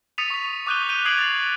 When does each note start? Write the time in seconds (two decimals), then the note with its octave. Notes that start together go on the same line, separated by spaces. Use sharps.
0.18 D#6 A6 B6 C#7 D#7 F7
0.30 C#6 B6
0.67 D6 D#6 F#6 G6 D#7 G7
0.89 G6 D#7 G7
1.05 D#6 G#6 C7 D7 F#7
1.18 A6 D#7 F7